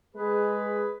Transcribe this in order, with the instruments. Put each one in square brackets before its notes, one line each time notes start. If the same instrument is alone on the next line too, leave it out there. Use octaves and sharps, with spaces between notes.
[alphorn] G#3 [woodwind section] G#4 B4